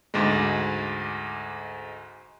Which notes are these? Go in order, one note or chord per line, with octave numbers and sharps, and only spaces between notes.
D2 G#2 G#3